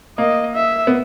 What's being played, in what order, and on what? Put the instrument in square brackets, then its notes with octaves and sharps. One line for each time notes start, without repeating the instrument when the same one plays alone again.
[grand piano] A#3 [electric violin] D#5
[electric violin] E5
[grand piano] B3